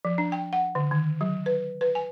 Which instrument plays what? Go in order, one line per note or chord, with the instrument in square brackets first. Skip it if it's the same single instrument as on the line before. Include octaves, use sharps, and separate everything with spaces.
[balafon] F3
D4
G5
F#5
D3
D#3
F#3
B4
B4
G#5